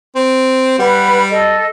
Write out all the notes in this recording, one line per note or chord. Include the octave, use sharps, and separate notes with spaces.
C4
G3 B4 F#5
A4 D#5